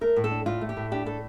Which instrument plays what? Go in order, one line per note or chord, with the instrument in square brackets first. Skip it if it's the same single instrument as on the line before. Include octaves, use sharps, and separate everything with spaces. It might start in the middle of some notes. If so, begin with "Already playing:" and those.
[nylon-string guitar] A3 A#4
A2
A4
D4
A2 F4
A3
G4
A2
D4 G4
A2 A4